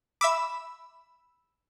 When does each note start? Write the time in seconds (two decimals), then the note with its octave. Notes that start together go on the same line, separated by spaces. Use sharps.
0.21 E5 B5 D6 E6